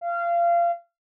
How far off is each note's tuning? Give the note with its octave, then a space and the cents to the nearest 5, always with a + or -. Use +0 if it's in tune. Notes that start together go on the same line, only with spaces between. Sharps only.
F5 -25